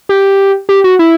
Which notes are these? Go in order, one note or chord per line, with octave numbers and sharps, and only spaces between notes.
G4
G4
F#4
E4